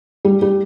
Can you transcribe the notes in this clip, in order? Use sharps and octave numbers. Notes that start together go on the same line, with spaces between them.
G3
G3